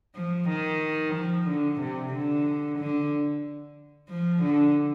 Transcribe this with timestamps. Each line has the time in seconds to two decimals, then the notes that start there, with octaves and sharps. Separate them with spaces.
0.15 F3
0.49 D#3
1.14 F3
1.47 D3
1.79 C3
2.12 D3
2.78 D3
4.09 F3
4.42 D3